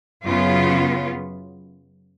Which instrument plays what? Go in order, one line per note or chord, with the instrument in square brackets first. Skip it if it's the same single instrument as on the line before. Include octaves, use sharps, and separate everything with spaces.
[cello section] F#2 C#3 F#3 B3 F4